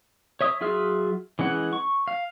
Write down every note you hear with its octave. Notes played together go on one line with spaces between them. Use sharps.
C#5 E5 D#6
F#3 F4 G#4 E5 F6
E3 G#3 C#4 F#5
C#6
F5